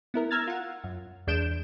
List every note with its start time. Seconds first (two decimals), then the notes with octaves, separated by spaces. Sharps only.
0.14 B3 E4 A#4
0.31 A#5 E6 F6 G#6 A6
0.47 F4 F#5
0.84 F#2
1.27 E2 G#3 D4 G6 D7 E7